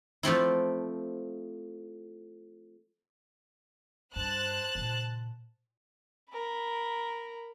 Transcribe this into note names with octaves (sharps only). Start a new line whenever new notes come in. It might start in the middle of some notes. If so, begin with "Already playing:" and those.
F3 A3 C4 E4
G2 C5 A5 F#6
A#2 C#3
A#4 B5